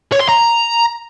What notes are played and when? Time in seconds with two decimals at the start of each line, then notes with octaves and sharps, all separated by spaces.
0.12 C#5
0.20 C6
0.29 A#5